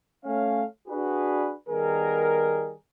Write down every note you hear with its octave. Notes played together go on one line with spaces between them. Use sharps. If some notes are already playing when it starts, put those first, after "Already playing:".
A3 C#4 F5
D4 F#4 G#4 B4
D#3 G3 B3 G#4 A#4